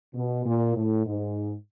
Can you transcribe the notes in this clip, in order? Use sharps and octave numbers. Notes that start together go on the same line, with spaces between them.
B2
A#2
A2
G#2